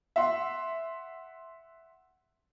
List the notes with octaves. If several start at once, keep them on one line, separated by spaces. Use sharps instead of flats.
E5 F#5 C6